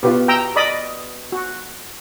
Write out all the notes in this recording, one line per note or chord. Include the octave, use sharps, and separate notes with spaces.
B2 B3 F4 G4
G5 A#5 E6
D5 D#5 B5
F#4